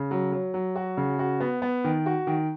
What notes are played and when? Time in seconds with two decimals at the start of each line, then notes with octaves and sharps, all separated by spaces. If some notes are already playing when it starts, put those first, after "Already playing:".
Already playing: C#3
0.11 F#3
0.32 F#3
0.54 F#3
0.76 F#4
0.97 C#3
1.19 F#4
1.40 B3
1.62 B3
1.84 D#3
2.06 F#4
2.27 D#3